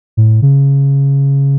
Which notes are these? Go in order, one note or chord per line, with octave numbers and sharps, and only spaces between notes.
A2
C#3